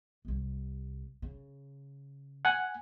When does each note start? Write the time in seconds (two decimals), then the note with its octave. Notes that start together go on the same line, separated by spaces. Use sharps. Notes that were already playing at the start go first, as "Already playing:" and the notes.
0.25 C2 C3
1.22 C#3
2.45 F#5 G#5